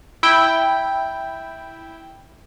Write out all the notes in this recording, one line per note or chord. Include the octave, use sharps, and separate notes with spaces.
E4 G5